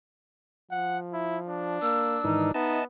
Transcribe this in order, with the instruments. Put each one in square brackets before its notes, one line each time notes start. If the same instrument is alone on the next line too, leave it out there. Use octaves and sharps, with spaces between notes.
[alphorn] F3 [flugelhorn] F#5
[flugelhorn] E4
D4
[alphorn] A#3 [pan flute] E6
[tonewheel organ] G#2 D#3 E3 [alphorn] D#4
[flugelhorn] B3 [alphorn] D#4 [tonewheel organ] D#5 E5 A5